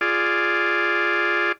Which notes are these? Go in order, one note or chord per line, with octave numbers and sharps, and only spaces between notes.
F4 G#4 D5